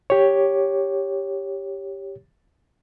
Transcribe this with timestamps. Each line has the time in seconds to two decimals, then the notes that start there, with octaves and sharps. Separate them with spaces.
0.10 G4 C#5